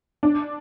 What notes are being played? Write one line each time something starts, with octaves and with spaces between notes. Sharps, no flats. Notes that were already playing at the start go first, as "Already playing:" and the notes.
D4